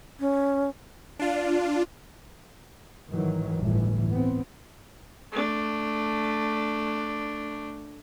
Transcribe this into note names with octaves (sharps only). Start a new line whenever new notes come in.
C#4
D4 F4
G#2 D#3 E3 F#3
G1 D2 A2 E3
B3 C4
A3 D4